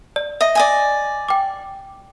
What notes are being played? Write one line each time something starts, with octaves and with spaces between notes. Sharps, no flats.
D5
D#5 E5
D5 D#5 G#5
G5 D6